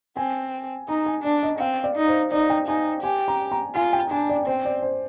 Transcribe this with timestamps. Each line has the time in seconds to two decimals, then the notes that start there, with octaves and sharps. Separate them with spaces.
0.17 C4 G#5
0.89 D#4 A#5
1.06 G#5
1.24 D4 D5
1.43 D#5
1.60 C4 F5
1.84 D5
1.96 D#4
2.08 C5
2.32 D#4 D5
2.50 G5
2.68 D#4 G#5
3.03 G4 G#5
3.28 A#5
3.52 A#5
3.75 F4 G#5
3.93 G5
4.11 D4 G#5
4.30 D5
4.47 C4 C5
4.65 D5
4.82 C5